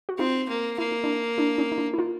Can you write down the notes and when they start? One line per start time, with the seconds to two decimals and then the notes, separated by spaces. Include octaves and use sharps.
0.09 F#4
0.18 C4 D#4 F4
0.49 A#3
0.78 A#3 E4
0.92 D#4
1.04 D4 E4
1.38 D4 E4
1.58 C#4 D#4
1.72 D#4
1.78 D4 E4
1.94 E4
1.98 D#4 F4